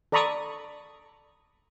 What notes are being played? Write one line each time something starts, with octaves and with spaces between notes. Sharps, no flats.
A4 D5 A#5 B5 C#6 D#6